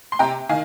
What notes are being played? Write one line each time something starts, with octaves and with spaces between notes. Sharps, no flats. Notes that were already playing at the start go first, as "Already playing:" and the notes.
C6
C3 G5 A#5
D#3 F5 G#5